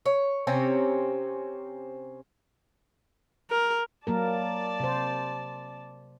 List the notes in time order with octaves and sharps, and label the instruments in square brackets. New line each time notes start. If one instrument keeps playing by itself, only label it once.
[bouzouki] C#5
C3 C4 C#4 A#5
[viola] A#4
[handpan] F#3 A#3 A#4 [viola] D5 A5
[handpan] C3 C5